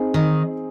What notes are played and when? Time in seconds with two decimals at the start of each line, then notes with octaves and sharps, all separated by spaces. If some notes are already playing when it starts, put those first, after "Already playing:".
Already playing: C4 D#4 G#4
0.14 D#3